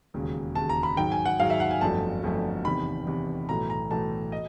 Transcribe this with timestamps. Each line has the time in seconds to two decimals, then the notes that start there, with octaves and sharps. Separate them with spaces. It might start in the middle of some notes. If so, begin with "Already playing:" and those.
0.14 E1 D#2 C#3
0.55 E1 D#2 C#3 A5
0.69 A#5
0.83 B5
0.97 G#2 D#3 F#3 G5
1.12 G#5
1.25 F#5
1.39 G#2 D#3 F#3 F5
1.50 E5
1.60 F#5
1.71 G#5
1.81 G1 F2 D3 F#3 A3 A5
2.23 G1 F2 D3 F#3 A3
2.65 E2 C3 D#3 B5
3.07 E2 C3 D#3
3.49 B1 A2 E3 A3 A#5
3.70 A#5
3.91 B1 A2 E3 A3 A5
4.32 D#5